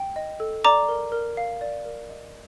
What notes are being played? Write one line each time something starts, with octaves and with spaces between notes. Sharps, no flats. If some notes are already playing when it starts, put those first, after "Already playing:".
Already playing: G5
D#5
A4
D5 A#5 D6
A#4
A#4
F5
D5
A#4
D#5